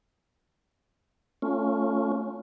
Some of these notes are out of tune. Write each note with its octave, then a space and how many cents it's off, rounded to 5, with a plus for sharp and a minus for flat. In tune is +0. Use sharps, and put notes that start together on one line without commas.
A3 +0 C#4 +0 F4 +0